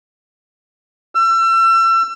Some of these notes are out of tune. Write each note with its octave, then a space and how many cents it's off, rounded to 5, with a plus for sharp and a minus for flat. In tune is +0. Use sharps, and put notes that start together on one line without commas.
E6 +35